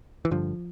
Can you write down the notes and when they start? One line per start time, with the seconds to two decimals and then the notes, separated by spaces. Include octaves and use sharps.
0.25 E3
0.31 G2 D3 F3